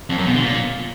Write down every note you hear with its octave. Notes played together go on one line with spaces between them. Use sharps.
F2
F#2
B2
D3
A#2